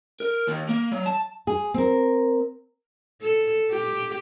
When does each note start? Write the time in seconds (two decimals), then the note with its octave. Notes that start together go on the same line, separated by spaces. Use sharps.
0.20 A#4
0.47 D#2
0.69 A#3
0.92 F#3
1.06 A5
1.47 G#4
1.74 C4 A#4
3.21 A4
3.71 G4